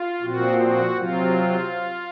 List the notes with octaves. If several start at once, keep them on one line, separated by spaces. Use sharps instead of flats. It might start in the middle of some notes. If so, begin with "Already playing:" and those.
Already playing: F4
A#2 F3 C4 F#4
F#4
C3 F#3 C4 F4